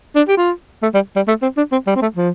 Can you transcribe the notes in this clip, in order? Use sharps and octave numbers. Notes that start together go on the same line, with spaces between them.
D4
G4
F4
A3
G3
G3
A3
C4
D4
C4
G3
C4
A3
F3